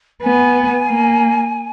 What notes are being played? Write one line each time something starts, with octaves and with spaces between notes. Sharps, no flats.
B3 G#5
A#3